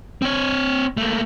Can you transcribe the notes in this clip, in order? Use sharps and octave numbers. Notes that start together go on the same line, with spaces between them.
C4 C#5
A3 A#3